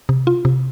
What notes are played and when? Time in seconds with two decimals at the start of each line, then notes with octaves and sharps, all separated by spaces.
0.09 C3
0.27 F4
0.45 C3